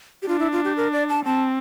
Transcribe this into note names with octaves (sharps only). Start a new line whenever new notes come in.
G4
D4 F4
E4
F4
G4
A#4
D5
A5
C4 A5